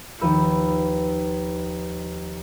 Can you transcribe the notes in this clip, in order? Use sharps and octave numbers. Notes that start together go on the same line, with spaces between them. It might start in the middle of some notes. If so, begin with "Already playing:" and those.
D#2 F3 B4 E6 G6 C#7